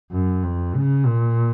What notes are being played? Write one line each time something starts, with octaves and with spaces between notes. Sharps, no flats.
F#2
F2
C#3
A#2